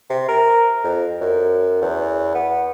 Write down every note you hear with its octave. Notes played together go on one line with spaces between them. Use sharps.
C3
A#4
F2
F#2
E2
B3